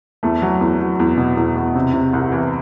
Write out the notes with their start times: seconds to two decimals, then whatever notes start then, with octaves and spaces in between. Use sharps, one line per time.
0.23 E2 A3
0.42 F#3
0.61 E2
0.80 F#3
1.00 E2
1.18 B2
1.37 E2
1.56 E2
1.75 C3
1.94 C3
2.13 C2
2.32 E3